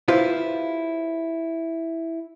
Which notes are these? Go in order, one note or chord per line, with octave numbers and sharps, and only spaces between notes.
E4 F4 G4 B4 C5 F5